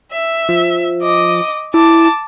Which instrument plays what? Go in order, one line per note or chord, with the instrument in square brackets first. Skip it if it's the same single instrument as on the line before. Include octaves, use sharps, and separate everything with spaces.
[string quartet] E5
[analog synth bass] F3
[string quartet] D#5 D6
[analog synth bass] E4 [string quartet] A5 D6